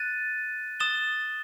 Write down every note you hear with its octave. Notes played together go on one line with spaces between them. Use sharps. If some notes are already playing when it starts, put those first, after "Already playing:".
Already playing: F#6 A6 D#7
D#6 A6 E7 G7